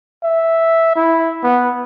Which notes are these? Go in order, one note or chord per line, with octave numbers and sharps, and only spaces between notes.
E5
E4
B3